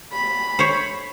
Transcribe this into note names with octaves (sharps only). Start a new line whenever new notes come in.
B5
C5 C#5